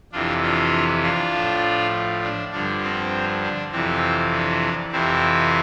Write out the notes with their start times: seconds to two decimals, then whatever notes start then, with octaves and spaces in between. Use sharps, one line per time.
0.12 F2 C3 E3 D4 F4
0.42 D4 F4
1.03 D4 F4
1.33 A2 F3
2.23 D4
2.52 G2 D3 F3 D4
2.83 C4
3.43 D4
3.72 F2 C3 E3 C4
4.33 D4
4.92 F2 C3 E3 C4 E4